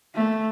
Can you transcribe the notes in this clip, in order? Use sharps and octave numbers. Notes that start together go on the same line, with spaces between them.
A3